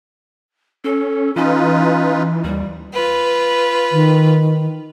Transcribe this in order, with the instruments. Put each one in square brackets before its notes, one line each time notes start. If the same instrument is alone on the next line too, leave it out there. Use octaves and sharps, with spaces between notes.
[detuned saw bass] C#4 [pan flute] A4
[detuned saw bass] E3 [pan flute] C#4 [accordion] D#4 F4 B4
[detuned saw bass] D#2 [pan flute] G3
[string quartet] F4 B4
[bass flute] D#3